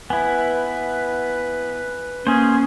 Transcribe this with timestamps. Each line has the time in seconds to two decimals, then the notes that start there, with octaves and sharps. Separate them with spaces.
0.10 B3 E4 B4 G#5
2.27 A#3 C#4 G#4 C5